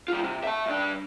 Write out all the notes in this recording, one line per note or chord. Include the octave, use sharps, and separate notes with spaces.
G3 F4
C3
E5 A5
G2 D4